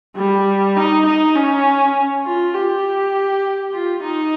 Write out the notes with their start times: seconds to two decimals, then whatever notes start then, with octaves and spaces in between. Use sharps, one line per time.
0.16 G3
0.76 D#4
1.06 D#4
1.35 C#4
2.25 F4
2.54 G4
3.73 F4
4.03 D#4